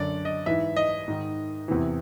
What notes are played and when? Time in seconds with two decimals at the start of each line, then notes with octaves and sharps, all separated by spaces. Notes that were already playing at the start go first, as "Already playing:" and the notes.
Already playing: F#2 D3 D5
0.25 D#5
0.46 G#2 E3 E5
0.76 D#5
1.08 G#2 D#3
1.68 E2 C3 E3